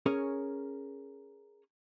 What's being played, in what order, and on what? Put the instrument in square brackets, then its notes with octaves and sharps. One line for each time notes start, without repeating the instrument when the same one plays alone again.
[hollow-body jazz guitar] C#4 G#4 A#4 C#5